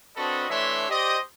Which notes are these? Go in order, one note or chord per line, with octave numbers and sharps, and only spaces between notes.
C4 D4 F#4 A4 B4 D#5
E3 A3 D4 C#5 E5 C6
G4 C5 D5 D#5